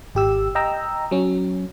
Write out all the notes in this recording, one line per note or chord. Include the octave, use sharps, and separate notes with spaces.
G#1 G4 E6
D#5 G5 A#5 E6
F#3 C#4